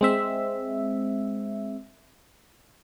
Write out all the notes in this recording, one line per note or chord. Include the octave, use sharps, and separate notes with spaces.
G#3 C4 E5